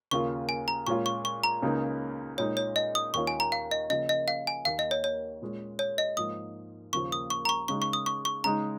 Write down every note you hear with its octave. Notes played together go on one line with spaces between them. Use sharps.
D#2 C#3 A#3 F4 C#6
G#5
A#5
A#2 G#3 C#4 F4 C#6
C#6
C#6
A#5
C#2 C#3 A#3 D#4
A#2 G#3 D#4 C#5
C#5
D#5
D#6
D#2 D#3 C#4 F4 C#6
G#5
A#5
F5
D#5
C#3 F3 A#3 D#5
D#5
F5
G#5
D#2 D#3 A#3 F5
D#5
C#5
C#5
A#2 G#3 C#4
C#5
D#5
G#2 F3 A#3 D#6
D#2 C#3 F3 A#3 C#6
D#6
C#6
A#5
C#6
C#3 G#3 D#4 C#6
C#6
D#6
C#6
C#6
C#3 G#3 D#4 A#5